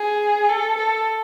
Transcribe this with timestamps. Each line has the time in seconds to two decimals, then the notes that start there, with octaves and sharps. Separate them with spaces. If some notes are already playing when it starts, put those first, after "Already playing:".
Already playing: G#4
0.48 A4
0.78 A4